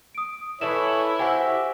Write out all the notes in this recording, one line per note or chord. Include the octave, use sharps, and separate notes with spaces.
D#6 D7
E3 A3 E4 B4 C#5 E7
F#4 G4 C5 E5 F#5 G#5